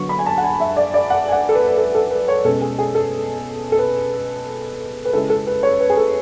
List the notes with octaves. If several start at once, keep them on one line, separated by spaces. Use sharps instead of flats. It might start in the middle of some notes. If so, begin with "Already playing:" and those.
Already playing: D3 F#3 B3 C#6
B5
G#5
A5
F#5
G#5
E5
D5
D5
F#5
G#5
F#5
A4
B4
B4
A4
A4
B4
C#5
B2 G#3 C#4 A4
G#4
G#4
A4
A4
B4
B4
C#3 G#3 C#4 E4 A4
A4
B4
C#5
B4
G#4
A4